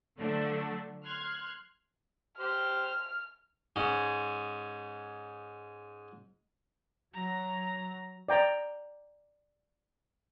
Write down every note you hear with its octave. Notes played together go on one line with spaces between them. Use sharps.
D3 F3 F#3 A3 D4
C6 F6 F#6 G#6
G4 C5 F6
G#2 G#3 C#4
F#3 A#5 A#6
D5 G5 A#5